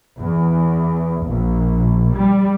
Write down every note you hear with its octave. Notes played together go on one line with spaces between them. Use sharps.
E2
A#1
G3